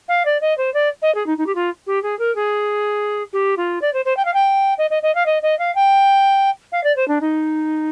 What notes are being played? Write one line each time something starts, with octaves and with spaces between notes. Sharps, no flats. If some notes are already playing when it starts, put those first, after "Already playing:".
F5
D5
D#5
C5
D5
D#5
G#4
D#4
D#4
G4
F4
G4
G#4
A#4
G#4
G4
F4
D5
C5
C5
G5
F5
G5
D#5
D#5
D#5
F5
D#5
D#5
F5
G5
F5
D5
C5
D4
D#4